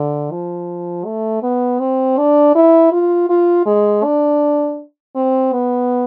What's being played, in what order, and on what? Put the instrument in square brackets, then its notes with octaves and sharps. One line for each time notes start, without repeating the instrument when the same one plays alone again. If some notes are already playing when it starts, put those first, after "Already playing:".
Already playing: [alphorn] D3
F3
A3
B3
C4
D4
E4
F4
F4
G#3
D4
C4
B3